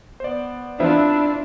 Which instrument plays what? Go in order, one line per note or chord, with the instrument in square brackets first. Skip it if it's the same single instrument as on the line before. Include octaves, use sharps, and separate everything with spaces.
[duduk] B3 [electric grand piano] C5 D5
[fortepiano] F3 B3 C4 [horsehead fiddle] D4 [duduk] E4 [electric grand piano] F4 E5